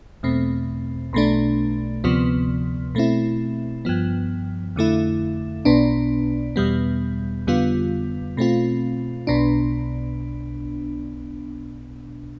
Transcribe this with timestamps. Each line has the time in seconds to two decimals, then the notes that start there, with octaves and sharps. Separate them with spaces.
0.23 E2 B2 A3 C4
1.13 B1 B2 A3 D4
2.04 D2 C3 F3 B3
2.95 B2 A3 C4 E4
3.85 G2 F3 B3
4.76 F2 D3 A3 E4
5.65 B1 B2 B3 D4
6.56 E2 B2 G3 B3
7.47 F2 D3 G3 B3 F4
8.37 B2 A3 C4 F4
9.27 B1 B2 B3 D4